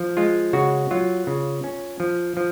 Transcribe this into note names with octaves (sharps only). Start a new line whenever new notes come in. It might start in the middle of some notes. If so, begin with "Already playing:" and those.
Already playing: F3
G#3 F4
C#3 F#4
F#3 F4
C#3
C#4
F3
F3